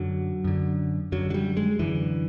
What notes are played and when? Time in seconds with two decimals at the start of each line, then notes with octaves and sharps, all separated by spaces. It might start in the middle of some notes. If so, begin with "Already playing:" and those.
Already playing: F#2 D3 F#3
0.44 F#2 D3
1.12 F#2 D3 F#3
1.30 F#3
1.34 G3
1.57 G#3
1.79 F#2 D3 E3